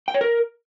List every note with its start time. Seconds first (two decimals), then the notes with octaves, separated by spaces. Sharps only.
0.08 G5
0.14 C#5
0.21 A#4